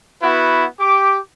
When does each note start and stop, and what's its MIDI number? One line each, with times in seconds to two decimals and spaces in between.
0.22 0.64 59
0.22 0.64 64
0.22 0.64 66
0.22 0.64 71
0.79 1.18 67
0.79 1.18 86